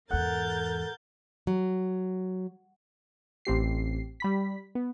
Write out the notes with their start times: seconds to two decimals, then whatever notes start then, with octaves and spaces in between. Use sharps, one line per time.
0.10 E2 G#2 A4 A#4 F#5 F#6 G6 A6
1.47 F#3
3.45 A1 C4 G4 C7
4.20 G3 B5 B6
4.75 B3